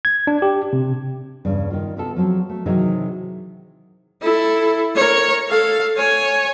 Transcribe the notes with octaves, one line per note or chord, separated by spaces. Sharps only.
G#6
D4
G4
C3
E2 G2 C#3
D#3 F4
C3 B3 F4 A4
F3 F#3 C4
A3
C3 D#3 E3 F#3 D#4 G#4
E4 A4
A#4 C#5
A4 F5
C#5 G#5